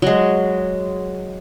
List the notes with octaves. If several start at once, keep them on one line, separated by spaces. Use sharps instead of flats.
F#3 G#3